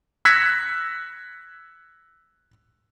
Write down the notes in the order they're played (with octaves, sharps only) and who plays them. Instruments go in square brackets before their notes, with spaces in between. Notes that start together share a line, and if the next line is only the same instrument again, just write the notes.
[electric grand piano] E6 F#6 G#6 A#6 B6 C#7